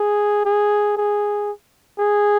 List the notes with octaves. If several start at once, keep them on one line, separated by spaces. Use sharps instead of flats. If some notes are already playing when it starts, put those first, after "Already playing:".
Already playing: G#4
G#4
G#4
G#4